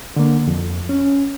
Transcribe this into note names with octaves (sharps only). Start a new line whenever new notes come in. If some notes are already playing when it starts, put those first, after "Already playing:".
D3 A#3
F2
C#4